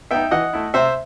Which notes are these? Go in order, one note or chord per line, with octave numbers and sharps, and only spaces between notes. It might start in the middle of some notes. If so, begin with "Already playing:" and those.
B3 D#4 E5 G5
E3 D#5 F#5
A3 E4
C3 C5 E5